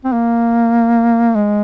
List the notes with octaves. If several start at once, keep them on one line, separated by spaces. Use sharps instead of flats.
C4
A#3
G#3